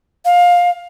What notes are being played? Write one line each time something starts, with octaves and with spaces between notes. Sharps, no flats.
F5